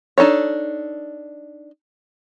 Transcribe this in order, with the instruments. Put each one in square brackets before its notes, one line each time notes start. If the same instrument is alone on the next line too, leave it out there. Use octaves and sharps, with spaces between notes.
[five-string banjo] D4 D#4 A4 C#5